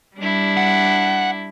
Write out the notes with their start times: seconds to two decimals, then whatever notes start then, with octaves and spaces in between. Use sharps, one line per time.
0.16 G3 D4 E4
0.57 F#5